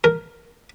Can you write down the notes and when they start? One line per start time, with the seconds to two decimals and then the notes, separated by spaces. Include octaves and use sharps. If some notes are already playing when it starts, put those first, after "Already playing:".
0.04 A#4